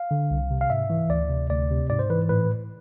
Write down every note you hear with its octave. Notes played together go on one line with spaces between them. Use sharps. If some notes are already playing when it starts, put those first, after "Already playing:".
Already playing: F5
D3
C2
C3
F5
G#2 E5
E3
D2 D5
C3
D2 D5
C3
G#2 D5
C5
E3 B4
A2 B4